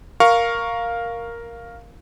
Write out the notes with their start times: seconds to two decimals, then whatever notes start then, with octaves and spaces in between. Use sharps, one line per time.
0.20 A#4 F5 C#6